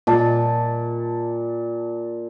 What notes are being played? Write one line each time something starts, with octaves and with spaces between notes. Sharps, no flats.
A#2 A5